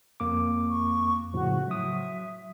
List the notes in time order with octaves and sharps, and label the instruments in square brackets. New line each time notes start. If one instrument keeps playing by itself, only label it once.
[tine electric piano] F2 A#3 D6
[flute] C#6
[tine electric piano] A2 C#3 F3 [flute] F#4
[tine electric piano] F#3 D#6 [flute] E5